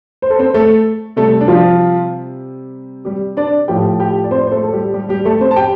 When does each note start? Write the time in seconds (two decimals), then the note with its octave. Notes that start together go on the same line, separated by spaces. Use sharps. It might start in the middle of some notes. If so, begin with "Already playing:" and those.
0.22 C5
0.30 A4
0.39 C4 C5
0.54 A3 A4
1.16 C3 G3 A3 A4
1.41 D4
1.48 F3 F4
3.05 G3 G4
3.37 D4 D5
3.68 A2 F3 A3 G4 G5
4.00 G4 G5
4.24 D5
4.31 C4 C5
4.47 C5
4.52 A3 A4
4.63 A4
4.72 G3 G4
4.93 G3 G4
5.09 G3 G4
5.25 A3 A4
5.41 C4 C5
5.51 A5
5.56 G4 G5